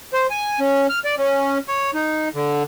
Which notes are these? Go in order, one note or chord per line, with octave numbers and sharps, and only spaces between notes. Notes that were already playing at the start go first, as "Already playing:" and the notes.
C5
G#5
C#4
F6
D5
C#4
C#5
D#4
D3